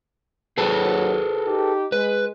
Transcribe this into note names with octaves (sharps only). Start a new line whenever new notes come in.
D#2 F#3 G#4 A4 B4
D#4 G4
G#3 B4